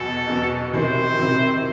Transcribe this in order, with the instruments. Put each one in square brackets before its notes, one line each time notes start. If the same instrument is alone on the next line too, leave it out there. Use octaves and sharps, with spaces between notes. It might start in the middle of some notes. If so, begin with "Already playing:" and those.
Already playing: [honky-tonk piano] E2 B2 F#3 [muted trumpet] A4
[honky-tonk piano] E2 B2 F#3
[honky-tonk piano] C3 D#3 F#3 C4 E4 [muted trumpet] C5
[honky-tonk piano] C3 D#3 F#3 C4 E4